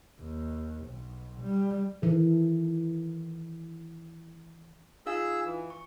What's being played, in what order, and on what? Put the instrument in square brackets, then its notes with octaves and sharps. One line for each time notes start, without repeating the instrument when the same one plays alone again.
[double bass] D#2
B1
G3
[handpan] D#3 E3 A4
[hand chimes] D#4 F4 F5 [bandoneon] G#4 E6
[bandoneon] E3
[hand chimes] C#6